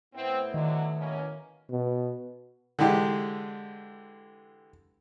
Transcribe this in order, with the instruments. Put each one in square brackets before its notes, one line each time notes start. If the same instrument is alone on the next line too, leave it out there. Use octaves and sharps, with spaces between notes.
[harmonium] A2 B3 E4 [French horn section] C4
[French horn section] D3 F#3 [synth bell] D#3
[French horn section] B2 A#3 C#4
[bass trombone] B2
[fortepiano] D3 E3 G#3 G4